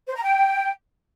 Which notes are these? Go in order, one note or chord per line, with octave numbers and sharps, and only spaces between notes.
C5
A#5
G5